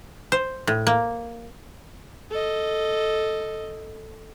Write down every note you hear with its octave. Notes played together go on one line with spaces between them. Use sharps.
C5
A2
A#3
A4 D#5